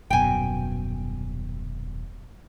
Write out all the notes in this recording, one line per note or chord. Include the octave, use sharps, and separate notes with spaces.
D#1 F#2 B2 G5 G#5